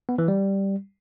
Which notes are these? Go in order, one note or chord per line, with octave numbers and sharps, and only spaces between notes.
B3
E3
G3